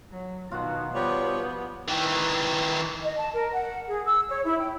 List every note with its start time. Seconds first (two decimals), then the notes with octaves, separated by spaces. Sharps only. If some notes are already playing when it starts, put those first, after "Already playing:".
0.11 F#3
0.51 B2 D#3 F4 F#4 F#5
0.94 F3 G3 B3 C#5
1.88 D#3 E3
3.01 D#5
3.18 A5
3.34 A#4
3.53 F#5
3.87 G#4
4.06 E6
4.28 C#5
4.45 E4
4.59 G5